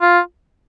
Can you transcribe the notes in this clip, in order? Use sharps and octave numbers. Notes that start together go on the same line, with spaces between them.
F4